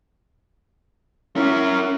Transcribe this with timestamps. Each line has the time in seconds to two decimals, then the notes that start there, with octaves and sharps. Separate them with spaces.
1.36 C#4 E4 A#4